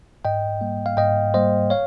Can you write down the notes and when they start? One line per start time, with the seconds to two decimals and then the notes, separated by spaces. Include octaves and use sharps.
0.25 G#2 D#5 G5
0.61 G3 A#3
0.86 F5
0.97 G#2 D#5 G5
1.34 G3 A#3 C5 D#5
1.70 C#5 F5